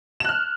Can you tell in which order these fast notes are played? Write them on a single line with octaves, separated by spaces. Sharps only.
E7 F#6 F6